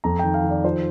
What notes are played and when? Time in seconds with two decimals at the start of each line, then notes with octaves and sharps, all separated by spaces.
0.04 F2 A#5
0.19 D#3 G5
0.34 F5
0.44 D#3
0.50 D5
0.64 F3 C5